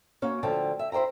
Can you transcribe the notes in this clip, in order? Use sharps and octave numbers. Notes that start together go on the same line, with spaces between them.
A#3 C#4 F#4
D2 D3 F3 G5 A5
E5
E4 C5 D#5 G5 A#5